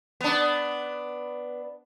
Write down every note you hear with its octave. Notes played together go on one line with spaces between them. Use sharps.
B3 D4